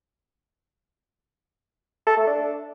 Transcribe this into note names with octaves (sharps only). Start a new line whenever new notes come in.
A4
A3
D4